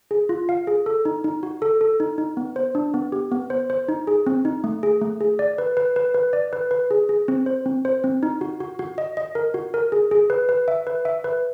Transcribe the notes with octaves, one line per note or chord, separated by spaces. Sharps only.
G#4
F4
F5
G#4
A4
D#4
D#4
F#4
A4
A4
D#4
D#4
B3
C5
D4
B3
G4
B3
C5
C5
D#4
G#4
C4
D#4
A3
G#4
A3
G#4
D5
B4
B4
B4
B4
D5
B4
B4
G#4
G#4
C4
C5
C4
C5
C4
D#4
F#4
F#4
F#4
D#5
D#5
A#4
F#4
A#4
G#4
G#4
B4
B4
E5
B4
E5
B4